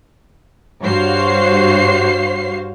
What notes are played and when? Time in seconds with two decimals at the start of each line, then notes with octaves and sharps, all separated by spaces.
0.82 G2 F#4 C5 C#5 F5 C7